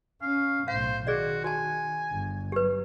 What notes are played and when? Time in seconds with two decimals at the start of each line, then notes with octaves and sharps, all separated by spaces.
0.22 C#4 F5
0.68 B1 A2 C5 F5
1.07 D#3 F#4 G#4 D5 D#5
1.44 F#4 G#5 A5
2.11 G1
2.52 F#3 G4 B4